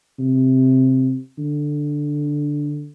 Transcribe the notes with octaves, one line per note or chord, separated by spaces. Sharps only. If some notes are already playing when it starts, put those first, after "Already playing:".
C3
D3